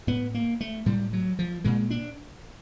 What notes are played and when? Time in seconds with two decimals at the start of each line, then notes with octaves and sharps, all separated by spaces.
0.07 A2 B3
0.34 A#3
0.61 A3
0.86 A2 G3
1.13 F#3
1.39 F3
1.65 A#2 G#3
1.90 D4